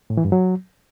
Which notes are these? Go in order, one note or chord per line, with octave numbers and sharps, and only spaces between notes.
A2
E3
G2
F#3